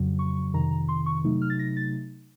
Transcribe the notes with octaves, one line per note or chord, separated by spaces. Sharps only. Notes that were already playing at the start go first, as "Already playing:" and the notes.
Already playing: F2 C#3 F#3
C#6
F2 C3 D#3 A#5
C6
C#6
C3 F#3 A3 D#4
F6
A6
A#6
A6